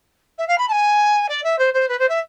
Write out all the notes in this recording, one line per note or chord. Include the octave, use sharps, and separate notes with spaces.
E5
F5
B5
A5
G#5
D5
E5
C5
C5
B4
C5
E5